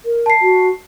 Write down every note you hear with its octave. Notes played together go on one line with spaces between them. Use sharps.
A#4
A5 C7
F#4